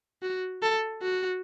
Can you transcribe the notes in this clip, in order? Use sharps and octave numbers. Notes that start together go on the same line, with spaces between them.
F#4
A4
F#4